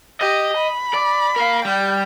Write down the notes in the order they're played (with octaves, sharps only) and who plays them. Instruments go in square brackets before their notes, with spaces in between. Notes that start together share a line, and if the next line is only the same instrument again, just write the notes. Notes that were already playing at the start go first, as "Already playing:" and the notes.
[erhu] G4 [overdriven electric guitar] D#5
[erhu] B5
[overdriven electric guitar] D5
A#4 F5
[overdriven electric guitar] G3 [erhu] G5